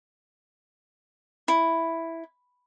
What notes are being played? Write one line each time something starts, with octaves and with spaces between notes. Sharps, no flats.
E4